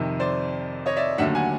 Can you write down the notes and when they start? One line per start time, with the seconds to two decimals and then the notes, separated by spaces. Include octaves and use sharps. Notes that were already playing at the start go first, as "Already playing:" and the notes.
Already playing: F2 C3 D#3
0.20 C5 D5
0.86 C#5 D#5
0.96 D5 E5
1.18 D#2 D3 F#3 A3 E5 F#5
1.35 F#5 G#5